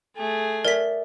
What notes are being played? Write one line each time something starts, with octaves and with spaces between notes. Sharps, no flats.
A3 G#4
A#4 D5 E5 B6